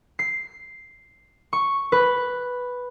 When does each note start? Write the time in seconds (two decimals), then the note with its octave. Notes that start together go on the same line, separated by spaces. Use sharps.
0.19 C7
1.53 C#6
1.92 B4